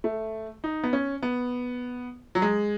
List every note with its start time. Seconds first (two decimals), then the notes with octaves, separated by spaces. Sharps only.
0.04 A3
0.64 D#4
0.84 B3
0.93 C#4
1.23 B3
2.35 F#3
2.42 G#3